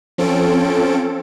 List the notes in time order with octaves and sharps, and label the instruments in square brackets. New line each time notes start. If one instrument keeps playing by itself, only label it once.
[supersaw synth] F3 C4 C#4 A4 D7